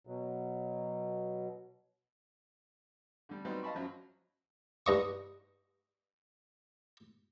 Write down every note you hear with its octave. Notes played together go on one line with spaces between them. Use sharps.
B2 F#3
D3 G3
F#3 G3 B3 C4 D#4 C5
D#5 F5 A5 B5 C#6
F#2 F3 F#3
G2 D#5 C#6